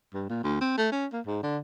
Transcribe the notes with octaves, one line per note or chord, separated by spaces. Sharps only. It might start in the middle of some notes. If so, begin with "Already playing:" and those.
G2
A#2
D2
C4
A3
C#4
A#3
G#2
D3